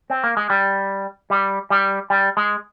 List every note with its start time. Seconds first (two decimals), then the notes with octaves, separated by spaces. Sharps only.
0.10 C4
0.24 A#3
0.37 G#3
0.50 G3
1.30 G3
1.70 G3
2.10 G3
2.37 G#3